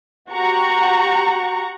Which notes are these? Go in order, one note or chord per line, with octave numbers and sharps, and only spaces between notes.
F#4 G4 F#5 A#5 C#6